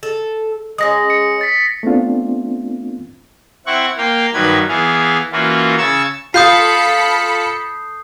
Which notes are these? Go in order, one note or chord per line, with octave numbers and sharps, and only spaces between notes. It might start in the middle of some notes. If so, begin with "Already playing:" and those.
A4
G#3 B3 C#4 D#6 A#6
C#7
A6 B6
A3 B3 C4 D4 F4
C4 E4 F#5 C#6
A#3 F5 G5
G2 D#3 F#3 B4 G#6
E3 B3 G#4 F5
E3 A#3 C#4 F4 F#4
C#3 A5 C#6 E6 G#6
F4 A4 B5 D#6 G6 C7 C#7